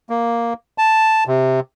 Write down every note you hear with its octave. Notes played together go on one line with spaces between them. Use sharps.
A#3
A5
C3